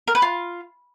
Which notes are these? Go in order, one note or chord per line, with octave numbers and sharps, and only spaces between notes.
A#4
B4
F4